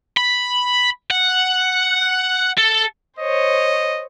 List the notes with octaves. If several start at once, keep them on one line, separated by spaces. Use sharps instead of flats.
B5
F#5
A4
C5 C#5 D#5